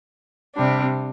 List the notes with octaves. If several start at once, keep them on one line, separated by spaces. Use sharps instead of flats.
C3 G3 D4